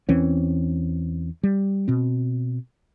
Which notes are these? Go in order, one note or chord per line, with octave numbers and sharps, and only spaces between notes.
E2 E3 C4 C#4
G3
B2 C4